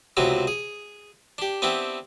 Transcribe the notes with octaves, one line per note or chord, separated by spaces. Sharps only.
C#2 C3 F#3 B3 E4 F#4
G#4
D4 G4
B3 C4 D4 E4 G4